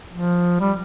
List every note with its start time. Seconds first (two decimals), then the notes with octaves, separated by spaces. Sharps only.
0.12 F3
0.60 G3